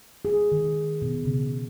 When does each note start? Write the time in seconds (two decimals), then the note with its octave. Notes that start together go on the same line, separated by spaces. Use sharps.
0.25 G#4
0.52 D#3
1.02 B2
1.25 C#3